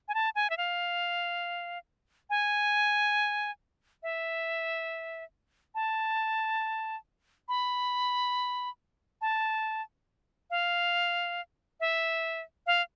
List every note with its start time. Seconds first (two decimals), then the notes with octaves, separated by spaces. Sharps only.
0.08 G#5
0.14 A5
0.35 G#5
0.50 E5
0.57 F5
2.30 G#5
4.03 E5
5.75 A5
7.48 B5
9.21 A5
10.50 F5
11.80 E5
12.67 F5